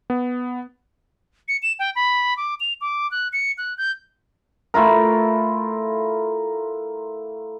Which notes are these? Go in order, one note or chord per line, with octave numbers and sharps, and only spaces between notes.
B3
C#7
E7
G5
B5
D6
F7
D6
F#6
C#7
F#6
G6
A3 E4 F4 A#4